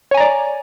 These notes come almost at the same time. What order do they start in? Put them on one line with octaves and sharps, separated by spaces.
C#5 G#5 A#5 D5